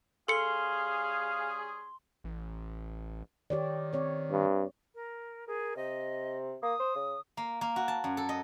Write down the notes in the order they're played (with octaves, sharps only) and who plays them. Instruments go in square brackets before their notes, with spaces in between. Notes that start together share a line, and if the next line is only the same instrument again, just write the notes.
[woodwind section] G3 C#4 G#4 [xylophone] A4 C#7 [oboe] F5 [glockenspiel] C6 G7
[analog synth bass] A1
[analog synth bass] D#3 [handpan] G4 C#5 D5
[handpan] C4 C#5 D5
[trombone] G2
[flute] A#4
[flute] G#4 [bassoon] A#4
[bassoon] C3 [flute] D#5
[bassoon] A#3 [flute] D#6
[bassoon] C5
C#3
[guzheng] A#3
A#3
F#4
A5
F#2
A4
D#5